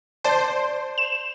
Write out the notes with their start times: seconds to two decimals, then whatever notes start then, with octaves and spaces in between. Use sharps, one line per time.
0.24 C5 D5 A5
0.98 E7